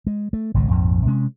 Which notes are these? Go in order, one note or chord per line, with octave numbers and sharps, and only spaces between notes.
G#3
A3
G#1 C#2 B2
A#1 F2 G#2
C3 G#3 C#4